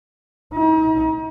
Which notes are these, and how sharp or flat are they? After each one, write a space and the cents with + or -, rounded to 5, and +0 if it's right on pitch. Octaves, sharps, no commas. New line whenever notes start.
D#4 +40